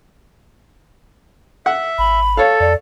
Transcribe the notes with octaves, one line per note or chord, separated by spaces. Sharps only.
E5 F#5
G#1 B5
A4 C#5 F5
F2 D5